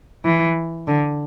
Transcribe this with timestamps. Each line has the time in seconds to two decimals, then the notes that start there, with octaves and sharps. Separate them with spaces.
0.24 E3
0.87 D3